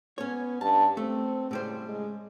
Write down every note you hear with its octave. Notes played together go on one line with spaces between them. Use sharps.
B3 C#4 C#5
G2 A5
A3 C4
A2 C#3 G3 C5
G#3